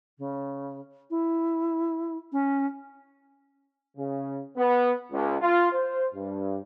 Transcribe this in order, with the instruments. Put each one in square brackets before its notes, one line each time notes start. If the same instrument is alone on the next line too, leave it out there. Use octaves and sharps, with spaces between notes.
[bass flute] C#3
E4
C#4
[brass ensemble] C#3
B3
C#2
F4
C5
G2